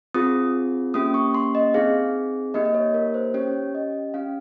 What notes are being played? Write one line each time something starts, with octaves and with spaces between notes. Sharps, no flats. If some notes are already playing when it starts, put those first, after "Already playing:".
C4 F4 G#4 D#6
A#3 C#4 G4 D#6
C#6
C6
D#5
C4 D#4 G#4 F5
A#3 D#4 G4 D#5
D#5
C#5
A#4
C5
C#4 G4 C#5
D#5
C#4 G4 F5